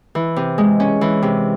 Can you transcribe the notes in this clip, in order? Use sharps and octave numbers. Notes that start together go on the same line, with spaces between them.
E3
C3
G#3
C#4
E3
C3